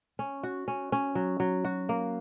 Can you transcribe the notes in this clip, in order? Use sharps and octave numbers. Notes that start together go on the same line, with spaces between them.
C#4
F#4
C#4
C#4
F#3
F#3
F#4
A#3